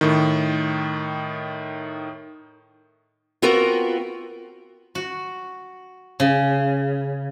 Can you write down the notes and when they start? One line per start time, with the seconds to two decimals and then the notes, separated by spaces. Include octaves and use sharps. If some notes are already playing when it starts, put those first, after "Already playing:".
0.01 A2 D#3
3.42 B3 C4 F4 F#4 A#4
4.95 F#4
6.20 C#3